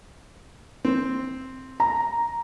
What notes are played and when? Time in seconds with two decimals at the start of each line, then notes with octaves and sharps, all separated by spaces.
0.85 C4
1.80 A#5